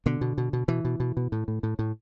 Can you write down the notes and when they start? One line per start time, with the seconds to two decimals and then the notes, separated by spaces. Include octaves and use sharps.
0.06 B2 D3
0.21 B2
0.38 B2
0.53 B2
0.68 B2 E3
0.85 B2
1.00 B2
1.17 B2
1.32 A2
1.48 A2
1.63 A2
1.79 A2